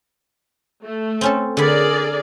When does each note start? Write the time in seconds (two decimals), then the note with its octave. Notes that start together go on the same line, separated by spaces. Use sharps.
0.84 A3
1.21 C4 C#4 A4
1.57 D3 G#4 A#4 D5 B5